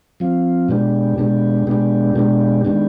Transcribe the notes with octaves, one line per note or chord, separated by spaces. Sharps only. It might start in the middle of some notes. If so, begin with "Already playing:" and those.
F3 C4 F4
B2 G#3 B3 D4 G4
B2 G#3 B3 D4 G4
B2 G#3 B3 D4 G4
B2 G#3 B3 D4 G4
D#3 G#3 B3 D4 G4